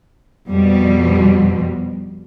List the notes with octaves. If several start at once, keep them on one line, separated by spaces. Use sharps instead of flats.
F2 B2 G3